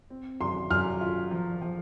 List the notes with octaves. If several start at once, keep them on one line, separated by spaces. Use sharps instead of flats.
C4
F#2 C6
F#2 F6
F4
F3
F3